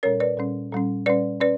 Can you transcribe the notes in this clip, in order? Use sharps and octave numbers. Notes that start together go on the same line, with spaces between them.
A#2 G3 C#4 A#4 C#5
B4 D5
A#2 G3 C#4
A#2 G3 C#4
A#2 G3 C#4 B4 D5
C#4 B4 D5